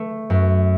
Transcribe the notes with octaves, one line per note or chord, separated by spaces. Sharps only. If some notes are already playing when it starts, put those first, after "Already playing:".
Already playing: A3
F#2